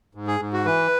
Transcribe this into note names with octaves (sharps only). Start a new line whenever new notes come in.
G#2
G#4
G#2
F#4
E3 B4